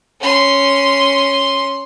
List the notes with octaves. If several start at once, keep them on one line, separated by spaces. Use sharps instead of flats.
C#4 C6